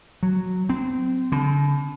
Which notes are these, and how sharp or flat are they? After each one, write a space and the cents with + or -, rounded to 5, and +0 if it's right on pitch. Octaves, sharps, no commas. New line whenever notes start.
F#3 -5
C4 -20
D3 -45